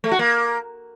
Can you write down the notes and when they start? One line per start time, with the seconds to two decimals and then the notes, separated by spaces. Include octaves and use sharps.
0.04 A3
0.11 F#4
0.19 A#3